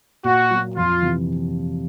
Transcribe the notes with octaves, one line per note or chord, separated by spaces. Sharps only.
A#2 F#4
F#3 A#3
F2 F4
C3 E3